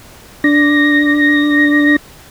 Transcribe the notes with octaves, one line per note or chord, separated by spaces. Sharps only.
D4 A#6